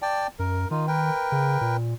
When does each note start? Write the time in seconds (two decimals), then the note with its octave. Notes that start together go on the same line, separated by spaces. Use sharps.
0.02 D5 G5 A5
0.39 F#2 A#4
0.71 D#3 D#4 F4
0.88 A#4 B4 G5
1.32 C#3
1.61 A#2